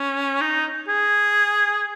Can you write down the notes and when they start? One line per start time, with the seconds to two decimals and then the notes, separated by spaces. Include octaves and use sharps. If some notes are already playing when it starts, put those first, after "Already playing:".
Already playing: C#4
0.41 D#4
0.88 G#4